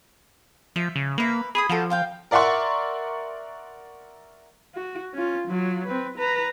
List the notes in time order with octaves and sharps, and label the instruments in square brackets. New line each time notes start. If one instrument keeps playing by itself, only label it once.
[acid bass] F3 [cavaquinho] E5
[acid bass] C#3
[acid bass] A#3 [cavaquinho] B4 E5
[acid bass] G#4 [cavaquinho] B5 C6 D#6
[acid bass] F3 [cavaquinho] F4 F#4 A4
[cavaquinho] F4 F5 G5
[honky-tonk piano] A#4 D5 E5 F#5 C6 C#6
[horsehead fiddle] F#4
C#4 F4
F#3 F4
C4 B4
B4 A#5